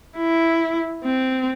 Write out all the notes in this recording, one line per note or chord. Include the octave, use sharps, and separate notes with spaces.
E4
C4